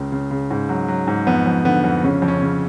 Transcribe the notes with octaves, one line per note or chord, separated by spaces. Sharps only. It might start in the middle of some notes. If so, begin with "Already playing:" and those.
Already playing: C#2 C#3
C#3
C#3
G#2
F#3
F#3
G#2
F2 B3
F2
D3 B3
F2
C#3 C#4
F2
C#4
C#3